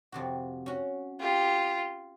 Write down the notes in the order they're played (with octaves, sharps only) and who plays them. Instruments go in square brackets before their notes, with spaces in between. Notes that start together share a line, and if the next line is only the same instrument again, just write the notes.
[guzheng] F2 C3 F#4
C#4 F#4
[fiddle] F4 G4